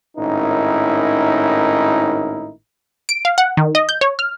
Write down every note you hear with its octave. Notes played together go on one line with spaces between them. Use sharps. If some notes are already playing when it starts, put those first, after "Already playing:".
G#1 A2 C#4 D#4 E4 A#4
D7
F5
F#5
D#3
D#5
G6
C#5
F6